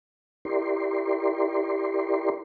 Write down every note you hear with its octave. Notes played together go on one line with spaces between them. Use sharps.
E4 G4 A#4 D5 C6